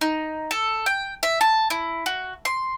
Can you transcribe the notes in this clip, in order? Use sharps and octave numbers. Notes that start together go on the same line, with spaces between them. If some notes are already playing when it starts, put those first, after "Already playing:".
D#4
A4
G5
E5
A5
E4
F#4
C6